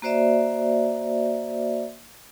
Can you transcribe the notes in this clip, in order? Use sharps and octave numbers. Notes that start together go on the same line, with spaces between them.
A#3 F#4 C5 D5 E5